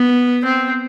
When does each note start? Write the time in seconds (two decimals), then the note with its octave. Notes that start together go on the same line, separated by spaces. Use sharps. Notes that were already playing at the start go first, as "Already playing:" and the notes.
Already playing: B3
0.45 C4